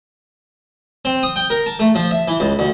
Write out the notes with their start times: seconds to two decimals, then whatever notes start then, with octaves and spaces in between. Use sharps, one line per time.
1.05 C4
1.23 D#6
1.36 G5
1.50 A#4
1.66 A5
1.80 A3
1.95 F3
2.11 E5
2.28 E3
2.40 C#2
2.59 D2